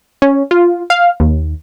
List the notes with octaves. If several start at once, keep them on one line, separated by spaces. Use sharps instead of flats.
C#4
F4
F5
D#2